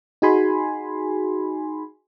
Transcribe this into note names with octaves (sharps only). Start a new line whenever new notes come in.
D#4 F#4 G#4 G#5 B5 C6